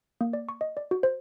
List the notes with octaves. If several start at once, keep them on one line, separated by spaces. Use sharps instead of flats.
A#3
D5
C#6
D#5
D5
F#4
C5